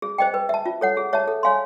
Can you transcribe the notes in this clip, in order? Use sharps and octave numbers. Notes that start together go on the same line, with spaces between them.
G#4
C5 D#5 G5
B4
E5 A5
F4
A4 C#5 F#5
G#4
C#5 E5 A5
A4
C#5 F5 G#5 C6